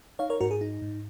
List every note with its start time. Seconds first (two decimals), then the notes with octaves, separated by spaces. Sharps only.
0.19 D#4 C#5 F5
0.30 A#4 C#5
0.41 G#2 F#4 A#4
0.51 G#4
0.61 D#4
0.82 G#2